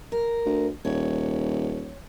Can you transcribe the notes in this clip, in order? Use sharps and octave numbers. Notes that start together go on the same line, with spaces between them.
A#4
D2
D#1 C#5